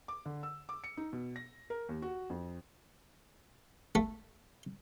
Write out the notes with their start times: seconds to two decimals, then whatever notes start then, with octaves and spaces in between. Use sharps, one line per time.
0.08 D6
0.26 D3
0.43 E6
0.69 D6
0.84 C#7
0.97 D#4
1.13 B2
1.36 A#6
1.70 A#4
1.89 D#2
2.02 F#4
2.30 F2
3.95 A3